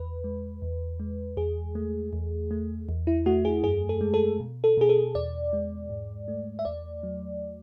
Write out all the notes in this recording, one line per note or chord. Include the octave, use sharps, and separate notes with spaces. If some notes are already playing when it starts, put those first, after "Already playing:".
Already playing: E2 B4
G#3
E2
G#3
E2 G#4
A3
E2
A3
E2
E4
A3 F#4
G#4
F#2 G#4
A4
G#3
A4
B2
A4
B2 G#4
A4
E2 D5
G#3
G#2
A3
E5
E2 D5
F#3